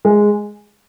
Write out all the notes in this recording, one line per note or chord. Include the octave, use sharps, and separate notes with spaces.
G#3